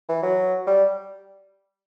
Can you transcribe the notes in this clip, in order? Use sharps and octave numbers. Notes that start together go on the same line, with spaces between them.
E3
F#3
G3